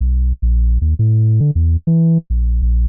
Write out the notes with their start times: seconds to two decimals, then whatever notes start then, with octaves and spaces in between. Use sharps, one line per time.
0.01 B1
0.42 A#1
0.81 D#2
0.99 A2
1.40 D3
1.55 E2
1.87 E3
2.30 A#1
2.62 A#1